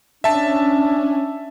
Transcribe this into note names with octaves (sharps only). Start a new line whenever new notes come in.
C#4 D4 E5 A5